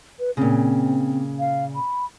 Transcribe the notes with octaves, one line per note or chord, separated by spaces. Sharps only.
B4
A#2 C#3 C4
F5
B5